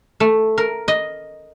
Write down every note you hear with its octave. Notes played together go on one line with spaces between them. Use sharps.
A3
A#4
D#5